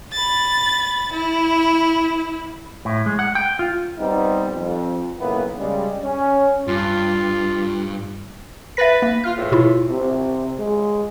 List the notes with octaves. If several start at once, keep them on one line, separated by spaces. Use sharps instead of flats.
B5 A6
E4
A2
G#3
F#5
G5
F4
G3 B3 C4 D#4
F2
B1 C#3 A#3 B3 E4 B4
C#3 G3 G#3
C#4
G2 F4
B4 E5 A6 A#6
A#3
F4 F6
E2 A2
B2 E4 F4
C3
G#3